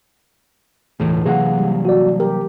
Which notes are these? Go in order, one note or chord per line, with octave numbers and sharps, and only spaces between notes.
E1 C#2 A2 E3
C3 F#3 A#3 G#4 F#5
G3
F#4 D5
G4 A#4